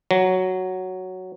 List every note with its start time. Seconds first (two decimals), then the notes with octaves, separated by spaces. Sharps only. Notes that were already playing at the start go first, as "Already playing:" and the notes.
0.11 F#3